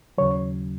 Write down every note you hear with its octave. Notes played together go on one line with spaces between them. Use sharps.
D#2 C#3 F#3 C#5